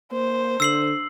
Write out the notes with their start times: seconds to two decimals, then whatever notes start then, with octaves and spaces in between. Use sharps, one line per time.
0.12 A#3 C5
0.60 D3 E6 C7 F#7